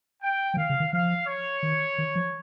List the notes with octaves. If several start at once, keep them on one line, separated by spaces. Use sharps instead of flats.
G5
F3
D#3 F5
C#3
D#3
F3 F5
C#5
D#3
D#3
F3